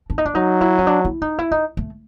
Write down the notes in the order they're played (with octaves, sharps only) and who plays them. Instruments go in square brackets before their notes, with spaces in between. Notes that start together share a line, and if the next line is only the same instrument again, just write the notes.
[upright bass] D4
D#4
D4
[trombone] F#3 [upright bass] D#4
[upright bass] E4
C#4
D4
E4
D#4
E4
D#4
A3